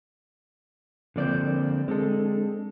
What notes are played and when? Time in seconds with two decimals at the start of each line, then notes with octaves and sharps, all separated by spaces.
1.16 D3 F3 A#3 C4 D5 G6
1.88 G#3 C4 D4 A4